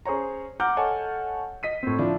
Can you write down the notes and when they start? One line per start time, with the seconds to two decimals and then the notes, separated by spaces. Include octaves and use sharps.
0.05 C#4 G#4 C5 C#5 A#5
0.60 F#5 A#5 D6 F6 G6
0.77 A4 C#5 D#5 F#5 G#5 A5
1.63 D#5 B6 D#7
1.83 A2 C4
1.98 F3 D4 E4